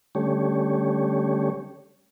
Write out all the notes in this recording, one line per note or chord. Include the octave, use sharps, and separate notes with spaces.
D3 G3 A3 C#4 G4 C#5